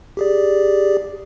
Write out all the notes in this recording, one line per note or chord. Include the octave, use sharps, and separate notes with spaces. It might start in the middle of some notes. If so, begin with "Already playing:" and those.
G4 G#4 D5